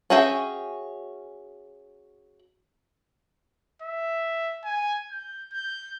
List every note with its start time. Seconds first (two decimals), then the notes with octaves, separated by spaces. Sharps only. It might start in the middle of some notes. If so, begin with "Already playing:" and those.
0.10 C#4 F#4 G#4 E5 G5
3.82 E5
4.64 G#5
5.12 G6
5.53 G6